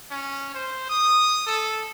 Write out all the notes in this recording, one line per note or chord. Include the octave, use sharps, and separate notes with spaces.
C#4
C5
D#6
A4